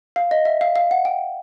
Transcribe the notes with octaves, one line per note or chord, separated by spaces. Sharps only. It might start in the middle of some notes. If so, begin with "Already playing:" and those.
F5
D#5
E5
F5
F5
F#5
G5